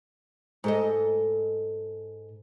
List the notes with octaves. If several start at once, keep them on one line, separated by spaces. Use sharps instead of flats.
G#2 A4 D#5